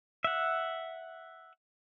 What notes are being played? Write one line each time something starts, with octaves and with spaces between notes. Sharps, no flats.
E5 F#5